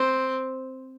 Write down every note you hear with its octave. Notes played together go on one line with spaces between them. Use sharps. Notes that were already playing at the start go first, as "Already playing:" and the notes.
Already playing: C4